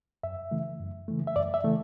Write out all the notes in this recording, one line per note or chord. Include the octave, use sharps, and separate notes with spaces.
F#2 E5
C#3 E3 A3
F#2
C#3 E3 A3
E5
F#2 D5
E5
C#3 E3 A3